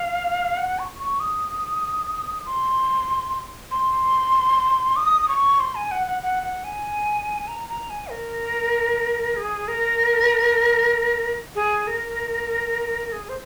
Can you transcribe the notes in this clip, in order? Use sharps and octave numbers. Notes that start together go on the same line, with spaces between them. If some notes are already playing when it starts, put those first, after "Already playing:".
Already playing: F5
F#5
C#6
C#6
D#6
C6
C6
D#6
C#6
C6
G#5
F#5
F#5
F#5
F#5
G#5
A#5
A#5
G#5
A#4
G#4
A#4
G#4
A#4
G#4
C5